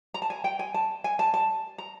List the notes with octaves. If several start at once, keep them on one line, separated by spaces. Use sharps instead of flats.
A#5
A5
G#5
G5
G#5
A5
G#5
A5
A5
A#5